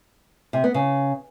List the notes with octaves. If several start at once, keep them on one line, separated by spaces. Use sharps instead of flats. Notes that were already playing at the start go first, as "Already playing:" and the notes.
C3
B3
C#3